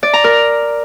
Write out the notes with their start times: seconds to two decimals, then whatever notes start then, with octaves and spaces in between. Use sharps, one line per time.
0.03 D5
0.13 A#5
0.24 A#4